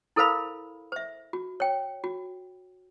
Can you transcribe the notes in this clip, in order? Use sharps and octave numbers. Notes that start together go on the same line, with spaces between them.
E4 A4 A#4 C5 F5 B5
C5 E5
F#4
C#5 G5
F#4